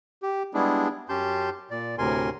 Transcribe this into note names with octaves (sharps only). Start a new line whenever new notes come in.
G4
G3 G#3 B3 D4 E4 G#4
F#2 C#4 G4 A5 C6 G6
A#2 D5
D2 A2 C3 A#4 G#5 C6